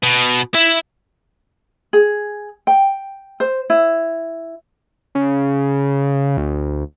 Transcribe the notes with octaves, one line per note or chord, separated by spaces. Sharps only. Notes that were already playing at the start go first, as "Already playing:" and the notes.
B2
E4 E5
G#4
G5
C5
E4
C#3
D2